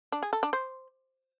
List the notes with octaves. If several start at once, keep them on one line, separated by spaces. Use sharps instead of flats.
D4
G#4
A4
D4
C5